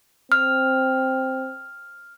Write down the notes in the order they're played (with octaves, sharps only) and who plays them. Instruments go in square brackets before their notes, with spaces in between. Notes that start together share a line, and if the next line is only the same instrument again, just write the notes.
[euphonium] C4 [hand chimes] F6